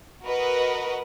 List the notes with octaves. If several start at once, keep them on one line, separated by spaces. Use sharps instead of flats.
F#4 A#4 B4 D#5